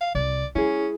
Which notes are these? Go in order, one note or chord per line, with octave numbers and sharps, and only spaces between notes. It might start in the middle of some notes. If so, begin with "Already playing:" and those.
F5
C2 D5
G#3 C#4 E4 G#4